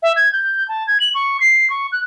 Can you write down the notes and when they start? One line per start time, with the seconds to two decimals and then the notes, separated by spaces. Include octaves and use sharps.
0.03 E5
0.16 G#6
0.33 G6
0.68 A5
0.87 G#6
1.00 F#7
1.15 C#6
1.40 C7
1.70 C#6
1.92 F#6